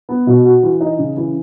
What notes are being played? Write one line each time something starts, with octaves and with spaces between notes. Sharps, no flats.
B3
B2
F#4
E3
D#4
C#3
E3